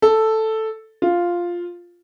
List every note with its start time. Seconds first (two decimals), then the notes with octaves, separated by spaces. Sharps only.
0.02 A4
1.02 F4